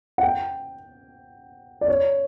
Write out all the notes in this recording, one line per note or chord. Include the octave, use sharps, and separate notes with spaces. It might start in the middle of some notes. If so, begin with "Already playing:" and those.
F#5
G5
D5
C#5